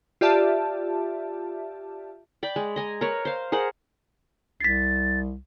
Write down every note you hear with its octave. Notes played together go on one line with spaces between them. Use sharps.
F4 G4 D5 E5 A5
D5 G5 B5
G#3
D#5 G#5 A#5
A#4 B4 C#5
C5 F5
G#4 A#4 C5 F#5
C2 A6 B6 C7